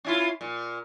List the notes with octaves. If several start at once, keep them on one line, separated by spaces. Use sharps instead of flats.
C#4 E4 F4
A#2